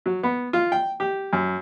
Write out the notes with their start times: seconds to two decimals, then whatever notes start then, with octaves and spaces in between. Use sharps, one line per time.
0.06 F#3
0.23 B3
0.53 F4
0.72 G5
1.00 G4
1.33 F#2